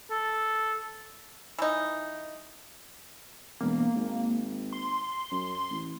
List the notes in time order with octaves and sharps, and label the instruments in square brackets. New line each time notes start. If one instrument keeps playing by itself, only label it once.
[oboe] A4
[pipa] E3 D#4
[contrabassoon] E1 [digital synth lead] A#3
[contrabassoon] G#1
[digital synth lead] C6
[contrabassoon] F#2
A1